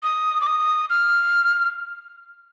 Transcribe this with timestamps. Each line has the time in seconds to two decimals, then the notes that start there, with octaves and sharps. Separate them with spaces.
0.03 D#6
0.41 D6
0.47 D#6
0.90 F6